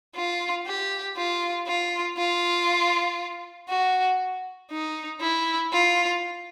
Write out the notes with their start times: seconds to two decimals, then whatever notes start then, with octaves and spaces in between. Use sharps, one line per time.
0.16 F4
0.67 G4
1.17 F4
1.67 F4
2.18 F4
3.69 F#4
4.71 D#4
5.21 E4
5.73 F4